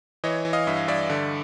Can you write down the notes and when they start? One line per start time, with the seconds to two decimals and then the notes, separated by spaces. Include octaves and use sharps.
0.24 E3 C#5 D#5
0.45 E3
0.53 D#5 F5
0.67 G2 E5
0.77 F5
0.88 G2 D5 E5
1.10 D3